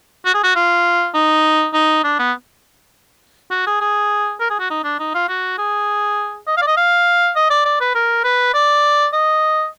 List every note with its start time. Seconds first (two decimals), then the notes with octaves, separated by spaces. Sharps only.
0.26 F#4
0.34 G#4
0.44 F#4
0.56 F4
1.15 D#4
1.73 D#4
2.04 D4
2.19 B3
3.51 F#4
3.67 G#4
3.81 G#4
4.40 A#4
4.50 G#4
4.60 F#4
4.70 D#4
4.84 D4
4.99 D#4
5.14 F4
5.29 F#4
5.58 G#4
6.47 D#5
6.57 F5
6.62 D5
6.67 D#5
6.77 F5
7.36 D#5
7.50 D5
7.65 D5
7.81 B4
7.95 A#4
8.24 B4
8.54 D5
9.13 D#5